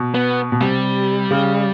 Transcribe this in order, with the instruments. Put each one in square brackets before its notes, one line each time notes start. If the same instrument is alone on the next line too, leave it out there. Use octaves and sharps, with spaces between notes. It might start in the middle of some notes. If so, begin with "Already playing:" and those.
Already playing: [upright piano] B2
[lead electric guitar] B3
[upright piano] B2
[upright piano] C3 [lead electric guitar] G3
[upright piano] C#3